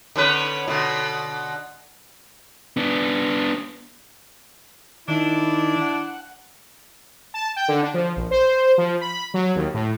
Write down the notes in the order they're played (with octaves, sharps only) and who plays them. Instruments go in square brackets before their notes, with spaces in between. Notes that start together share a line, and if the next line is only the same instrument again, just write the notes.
[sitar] D3 C#4 B4
B2 D3
[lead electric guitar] B3 D4
[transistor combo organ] D#3 [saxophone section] D4 E4
[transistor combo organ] F#5
[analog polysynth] A5
G5
D3
D4
F3
A#1
C5
F3
B5
F#3
D#2
A2